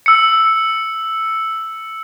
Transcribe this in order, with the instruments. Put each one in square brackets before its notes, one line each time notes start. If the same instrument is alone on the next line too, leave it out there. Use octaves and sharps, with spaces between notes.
[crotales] E6 C#7